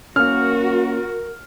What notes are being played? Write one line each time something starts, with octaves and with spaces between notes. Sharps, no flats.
A#3 C#4 F#4 A#4 F6